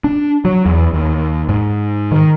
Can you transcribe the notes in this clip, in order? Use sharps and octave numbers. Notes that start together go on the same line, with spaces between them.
D4
F#3
E2
D#2
G#2
D#3